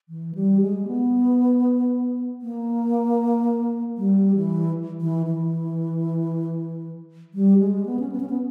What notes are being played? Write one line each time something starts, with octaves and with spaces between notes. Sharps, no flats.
E3
G3
G#3
B3
A#3
G3
E3
E3
E3
G3
G#3
B3
C#4
B3
C#4
B3